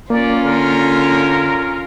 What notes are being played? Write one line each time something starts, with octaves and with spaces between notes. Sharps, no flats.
A#3 C#4 F4 D5
D3 A#4